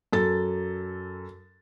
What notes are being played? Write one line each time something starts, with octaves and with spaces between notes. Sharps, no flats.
F#2 A4 A6